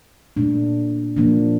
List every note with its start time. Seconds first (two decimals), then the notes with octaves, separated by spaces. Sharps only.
0.37 A#2 A3 D4
1.16 A#2 F3 A#3 D4